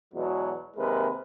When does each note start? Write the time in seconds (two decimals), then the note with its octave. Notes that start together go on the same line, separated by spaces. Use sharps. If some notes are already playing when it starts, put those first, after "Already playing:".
0.14 E2 B2 F#3 G#3
0.77 D#2 C3 G#3 A#4 B4